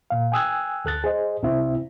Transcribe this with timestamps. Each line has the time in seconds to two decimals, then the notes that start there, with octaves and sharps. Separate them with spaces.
0.10 A#2 F5
0.32 G5 G#5 D#6 E6 F#6 G#6
0.85 D2 A4 F#6 A6
1.04 G#4 C5 D#5
1.43 C2 C3 C4 E4 E5